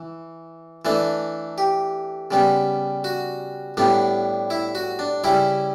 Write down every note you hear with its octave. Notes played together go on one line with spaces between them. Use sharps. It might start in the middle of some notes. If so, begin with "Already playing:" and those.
Already playing: E3
E3 A3 D4
G4
C#3 G3 B3
F#4
A2 G3 B3 D4
E4
F#4
D4
C#3 G3 C#4 E4